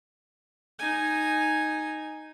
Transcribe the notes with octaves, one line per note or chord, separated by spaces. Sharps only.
D#4 G#5